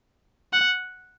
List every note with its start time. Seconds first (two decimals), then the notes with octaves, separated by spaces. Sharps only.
0.53 F#5